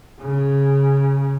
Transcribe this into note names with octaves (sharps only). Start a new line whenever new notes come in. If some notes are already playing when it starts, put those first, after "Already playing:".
C#3